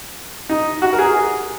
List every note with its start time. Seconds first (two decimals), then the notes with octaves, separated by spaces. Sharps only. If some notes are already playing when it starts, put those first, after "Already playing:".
0.49 D#4
0.82 F#4
0.93 A#4
0.99 G#4